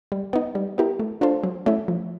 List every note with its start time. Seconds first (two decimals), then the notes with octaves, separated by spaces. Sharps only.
0.12 G3
0.33 B3 D#4
0.55 G3
0.78 B3 E4 G4 A#4
0.99 A3
1.21 D4 F4 A4 C5
1.44 F#3
1.66 A3 C#4 E4
1.88 F3